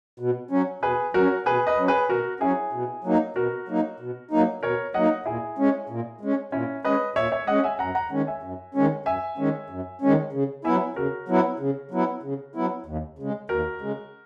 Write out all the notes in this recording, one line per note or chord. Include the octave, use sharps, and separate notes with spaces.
B2
F#3 C#4
B2 G#4 B4
F#3 C#4 F#4 A#4
B2 G#4 B4
B4 D#5
F#3 C#4
G#4 B4
B2 F#4 A#4
F#3 C#4 E4 G#4
B2
F#3 A#3 D#4
B2 F#4 A#4
F#3 A#3 D#4
B2
F#3 A#3 D#4
B2 A#4 C#5
F#3 A#3 D#4 D#5 F#5
A#2 E4 G#4
G#3 C#4
A#2
G#3 C#4
A#2 C#4 E4
G#3 C#4 B4 D#5
A#2 C#5 E5
C#5 E5
G#3 C#4 D#5 F#5
E5 G#5
F#2 F#5 A#5
F#5 A#5
D#3 G#3 C#4
E5 G#5
F#2
D#3 G#3 C#4
F#2 E5 G#5
D#3 G#3 C#4
F#2
D#3 G#3 C#4
C#3
F#3 B3 E4 E5 G#5
C#3 F#4 A#4
F#3 B3 E4
C#3
F#3 B3 E4
C#3
F#3 B3 E4
D#2
C#3 G#3
D#2 F#4 A#4
C#3 G#3